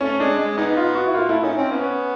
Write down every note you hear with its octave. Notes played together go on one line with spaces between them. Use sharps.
A3 C#4
G#3 D4
G#3
G#3 B3 D#4
F4
F#4
E4
A#3 F4
A3 E4
C#4 D#4
C4 C#4
B3 C#4